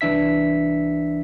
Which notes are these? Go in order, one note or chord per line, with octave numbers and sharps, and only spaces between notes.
C2 E3 D4 E5 B6